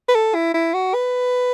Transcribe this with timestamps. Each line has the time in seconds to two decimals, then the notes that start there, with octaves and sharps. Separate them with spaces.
0.09 B4
0.15 A4
0.35 E4
0.54 E4
0.74 F#4
0.94 B4